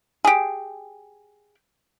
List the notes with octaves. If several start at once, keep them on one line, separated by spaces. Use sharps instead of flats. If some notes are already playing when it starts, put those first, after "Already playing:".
G4 G#4